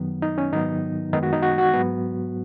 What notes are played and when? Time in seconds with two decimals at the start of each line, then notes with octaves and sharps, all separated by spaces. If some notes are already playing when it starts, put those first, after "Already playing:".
Already playing: F#2 D#3 F#3 B3
0.22 D#4
0.38 C#4
0.52 G#2 D#3 F#3 B3 D#4
1.13 F#2 D#3 G#3 B3 D#4
1.23 F#4
1.33 D#4
1.43 F#4
1.58 F#4
1.74 G#2 F#3 B3